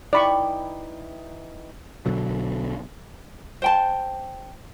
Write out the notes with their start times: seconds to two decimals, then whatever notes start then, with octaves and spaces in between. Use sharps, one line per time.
0.13 E3 D#4 D5 G5 B5 C#6
2.06 B1 B2 D3 F#3
3.62 C5 G5 A5